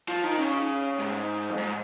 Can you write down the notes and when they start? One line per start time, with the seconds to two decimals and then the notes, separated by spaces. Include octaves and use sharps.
0.08 F3
0.24 D#3
0.38 C#3
0.99 G#2
1.50 F2
1.58 G#2